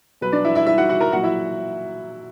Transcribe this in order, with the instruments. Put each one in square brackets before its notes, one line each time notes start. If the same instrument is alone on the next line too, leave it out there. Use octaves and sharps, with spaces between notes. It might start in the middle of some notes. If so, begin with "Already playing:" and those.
[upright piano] B2 F#3 B4
D4 D5
E4 E5
E4 E5
E4 E5
F#4 F#5
F#4 F#5
A#4 A#5
A#2 F#3 F#4 F#5
E4 E5